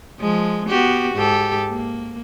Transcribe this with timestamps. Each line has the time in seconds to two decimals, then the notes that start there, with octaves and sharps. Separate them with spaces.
0.20 F3 G#3
0.68 B3 F#4 G4
1.14 G#2 G4 A4
1.70 A#3